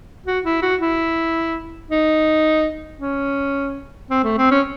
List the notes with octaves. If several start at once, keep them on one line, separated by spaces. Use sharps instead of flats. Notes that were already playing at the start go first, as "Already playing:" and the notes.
F#4
E4
F#4
E4
D#4
C#4
C4
A3
C4
C#4